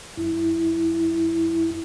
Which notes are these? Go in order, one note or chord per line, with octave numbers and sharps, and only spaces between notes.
F#2 E4